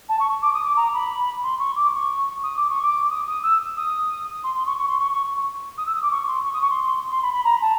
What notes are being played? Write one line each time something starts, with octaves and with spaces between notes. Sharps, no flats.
A5
C#6
D6
D#6
D6
A#5
B5
C6
C#6
D6
C#6
D#6
D6
C#6
D6
D#6
D#6
E6
D#6
C6
C6
C#6
C#6
C6
C#6
C#6
D#6
E6
D#6
D6
C#6
C6
C#6
D#6
C#6
C6
C6
B5
B5
A#5
A5